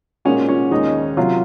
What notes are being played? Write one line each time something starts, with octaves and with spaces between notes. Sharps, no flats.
A#2 G#3 C#4 D#4 F#4
C#4
D#2 D#3 G#3 D#4
C3 F#3 F4